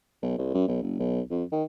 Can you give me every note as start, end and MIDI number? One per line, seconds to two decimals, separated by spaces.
0.22 0.36 35
0.38 0.51 36
0.54 0.68 42
0.68 0.79 35
0.82 0.95 30
0.99 1.21 35
1.30 1.43 41
1.52 1.63 51